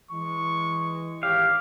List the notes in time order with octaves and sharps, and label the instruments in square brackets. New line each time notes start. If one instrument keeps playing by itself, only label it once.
[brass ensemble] E3 G#3 [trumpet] C#6
[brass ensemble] G#1 C#5 [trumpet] G4 [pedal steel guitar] F5